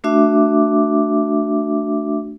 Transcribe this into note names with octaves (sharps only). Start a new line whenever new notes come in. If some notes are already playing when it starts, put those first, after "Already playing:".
A3 D4 F#4 E5 D6